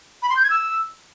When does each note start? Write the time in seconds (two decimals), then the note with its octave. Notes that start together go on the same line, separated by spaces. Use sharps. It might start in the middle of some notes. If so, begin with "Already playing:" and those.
0.22 B5
0.29 C6
0.36 G6
0.43 G#6
0.50 E6